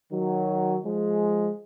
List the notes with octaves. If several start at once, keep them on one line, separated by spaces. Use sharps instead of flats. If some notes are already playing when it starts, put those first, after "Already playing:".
D#3 F#3
F3 G#3